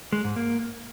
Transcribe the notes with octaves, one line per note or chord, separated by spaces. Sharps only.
G#3
G#2
A#3